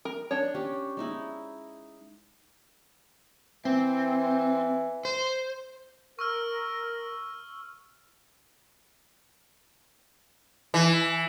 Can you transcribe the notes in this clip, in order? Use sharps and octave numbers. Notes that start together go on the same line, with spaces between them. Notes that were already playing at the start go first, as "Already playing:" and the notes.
A#4
D4 C#5
C#4 G4
G#3 D#4 E4
E3 C4
C5
A#4 C#6 E6 F6
E3